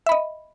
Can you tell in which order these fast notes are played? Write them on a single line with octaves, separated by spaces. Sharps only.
E5 B5 D#5